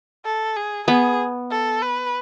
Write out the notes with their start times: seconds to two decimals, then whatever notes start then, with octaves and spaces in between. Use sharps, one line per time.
0.25 A4
0.56 G#4
0.88 B3 G#4
1.51 A4
1.82 B4